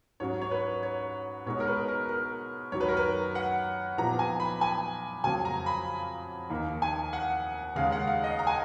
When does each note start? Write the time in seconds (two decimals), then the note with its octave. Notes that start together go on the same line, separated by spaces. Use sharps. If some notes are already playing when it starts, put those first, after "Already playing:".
0.20 G#2 F#3 C#4 C#5
0.42 C#5
0.51 B4
0.83 C#5
1.46 B2 G#3 D#4 C#5
1.60 A#4
1.67 B4
1.88 A#4
2.09 A#4
2.72 F#2 D#3 F#3 C#5
2.81 B4
2.88 A#4
2.97 B4
3.35 F#5
3.98 A#2 F3 B3 D#4 A#5
4.19 G#5
4.40 B5
4.61 G#5
5.24 F2 C#3 F#3 A#3 G#5
5.45 A#5
5.66 B5
6.50 D#2 D#3 A#3 D#4
6.82 G#5
7.13 F#5
7.76 D#2 C#3 G#3 F5
7.92 F#5
8.08 F5
8.24 D#5
8.39 A#5
8.47 G#5